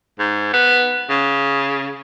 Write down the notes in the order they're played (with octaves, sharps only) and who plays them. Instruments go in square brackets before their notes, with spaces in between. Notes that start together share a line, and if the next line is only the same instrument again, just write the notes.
[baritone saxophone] G#2
B3
C#3